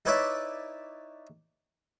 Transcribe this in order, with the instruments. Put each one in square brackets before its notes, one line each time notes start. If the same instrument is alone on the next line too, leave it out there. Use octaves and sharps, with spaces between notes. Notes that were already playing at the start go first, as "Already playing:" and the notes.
[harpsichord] D#4 E4 B4 C#5 D5 E5